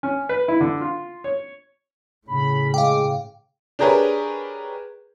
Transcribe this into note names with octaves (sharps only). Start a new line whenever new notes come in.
C#4
B4
E4
D3
F4
C#5
A2 C#3 B5
G#3 F5 G5 D6
D4 G4 G#4 A#4 B4 C#5